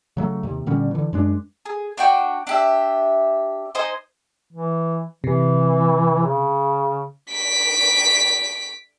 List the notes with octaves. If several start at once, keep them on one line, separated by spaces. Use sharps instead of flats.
C#3 F#3 A3
D#2 C3
A#2 D3 G3 C#4
D3 E3
F#2 G#3 D4
G#4
D4 F#4 G5
D4 G4 E5
D#4 C5 D#5 G#5
E3
C3 E3
C#3
B6 D7